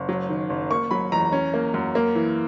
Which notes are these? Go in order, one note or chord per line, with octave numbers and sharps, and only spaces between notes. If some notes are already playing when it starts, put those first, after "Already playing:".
Already playing: F#1
F#3
D#3
F#1
A#3 C#6
F#3 B5
E2 A#5
C#4
A#3
F#2
A#3
E3